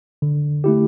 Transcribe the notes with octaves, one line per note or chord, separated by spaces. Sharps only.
D3
A3 E4 G4